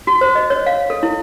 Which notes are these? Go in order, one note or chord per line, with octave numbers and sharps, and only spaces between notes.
F#4
C5
D#5
C#5
F5
A4
E4